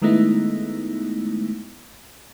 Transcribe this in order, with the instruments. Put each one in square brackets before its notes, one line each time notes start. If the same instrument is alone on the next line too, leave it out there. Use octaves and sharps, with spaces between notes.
[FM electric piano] D#3 G#3 A3 B3 D#4 E4